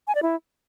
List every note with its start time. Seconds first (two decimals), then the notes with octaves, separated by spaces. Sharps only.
0.08 G#5
0.15 D5
0.22 E4